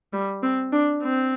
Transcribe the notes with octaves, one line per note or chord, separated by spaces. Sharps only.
G3
C4
D4
C4